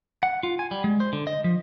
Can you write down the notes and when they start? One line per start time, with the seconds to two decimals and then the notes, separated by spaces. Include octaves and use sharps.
0.23 F#5
0.43 F4
0.59 G#5
0.71 G3
0.84 G#3
1.00 C5
1.13 D3
1.27 D#5
1.44 F3